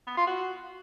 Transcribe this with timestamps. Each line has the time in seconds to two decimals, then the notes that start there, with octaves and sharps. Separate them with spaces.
0.07 B3
0.17 F4
0.27 F#4